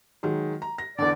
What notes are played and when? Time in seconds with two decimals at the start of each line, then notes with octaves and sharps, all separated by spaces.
0.23 D#3 F#3 G#3
0.62 A#5
0.78 A#6
0.99 E2 D3 D5